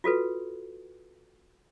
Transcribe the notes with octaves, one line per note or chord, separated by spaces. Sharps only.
F4 F#4 A4 B4